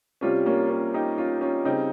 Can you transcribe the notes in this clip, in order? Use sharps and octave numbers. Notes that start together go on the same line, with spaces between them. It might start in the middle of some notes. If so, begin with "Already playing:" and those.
C3 G3 C#4 F4
A#3 C#4
C#4 F4
D#4 G4
C#4 F4
C#4 F4
C#3 G3 C4 D#4